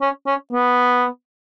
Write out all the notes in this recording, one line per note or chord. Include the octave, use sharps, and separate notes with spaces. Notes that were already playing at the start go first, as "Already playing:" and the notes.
C#4
C#4
B3